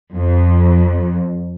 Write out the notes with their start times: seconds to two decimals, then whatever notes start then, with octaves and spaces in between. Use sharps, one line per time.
0.15 F2